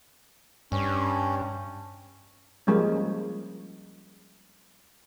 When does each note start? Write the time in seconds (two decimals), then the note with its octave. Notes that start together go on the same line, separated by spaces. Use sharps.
0.72 G2 C#4
2.67 F3 G3 G#3 A#3 C#4